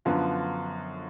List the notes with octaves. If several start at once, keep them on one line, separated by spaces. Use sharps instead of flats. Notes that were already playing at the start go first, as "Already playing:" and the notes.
F#2 D3 F3 B3 F4